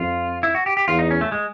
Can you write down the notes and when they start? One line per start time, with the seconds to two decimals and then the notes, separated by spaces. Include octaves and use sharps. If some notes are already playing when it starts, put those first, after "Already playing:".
Already playing: F2 F4
0.43 E4
0.55 F#4
0.66 G4
0.77 G4
0.88 E2 F4
0.99 D#4
1.11 C#4
1.21 A3
1.32 G#3